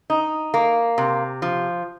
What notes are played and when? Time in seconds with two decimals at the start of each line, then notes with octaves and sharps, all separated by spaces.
0.10 D#4
0.54 A#3
0.98 C3
1.42 F3